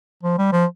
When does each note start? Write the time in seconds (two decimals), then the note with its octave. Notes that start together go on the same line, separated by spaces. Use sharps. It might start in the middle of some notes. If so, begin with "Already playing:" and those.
0.23 F3
0.38 G3
0.52 F3